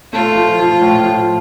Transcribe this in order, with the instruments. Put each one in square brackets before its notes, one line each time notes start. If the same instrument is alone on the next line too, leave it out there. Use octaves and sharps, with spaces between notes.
[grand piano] A3 [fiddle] F4
[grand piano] F3
F3
A2
F3